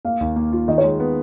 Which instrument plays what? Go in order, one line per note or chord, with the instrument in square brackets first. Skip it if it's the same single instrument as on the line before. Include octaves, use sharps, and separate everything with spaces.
[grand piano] A#3 [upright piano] F5
[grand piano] D#2
A#3
F4
[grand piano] D#3 [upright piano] D#5
[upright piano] C#5
[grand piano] G#3
B3